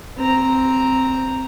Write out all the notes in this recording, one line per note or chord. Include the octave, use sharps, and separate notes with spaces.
C4 A#5